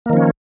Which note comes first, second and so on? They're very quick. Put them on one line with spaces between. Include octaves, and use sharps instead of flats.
A#3 D#3 F3 C#4